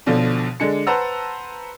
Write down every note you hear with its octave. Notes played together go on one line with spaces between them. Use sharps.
B1 B2 D3 F3
D3 G#3 D4 C#7
B4 C5 F#5 A5 A#5 E6